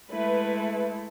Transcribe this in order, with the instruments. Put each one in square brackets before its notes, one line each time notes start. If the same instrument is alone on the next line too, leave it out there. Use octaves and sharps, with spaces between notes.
[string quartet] G#3 A3 E4 [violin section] B4